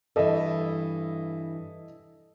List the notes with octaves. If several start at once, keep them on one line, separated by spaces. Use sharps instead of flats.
G2 E3 A4 D#5 E5